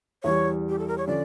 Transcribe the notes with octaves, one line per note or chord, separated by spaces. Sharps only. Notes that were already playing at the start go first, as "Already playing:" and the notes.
E2 E3 G3 C#5
G4
A4
A#4
C#5
D3 F3 C#4 D5